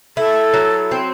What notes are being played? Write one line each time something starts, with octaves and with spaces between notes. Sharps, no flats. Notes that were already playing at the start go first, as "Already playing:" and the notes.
E4 A4
F#3
C4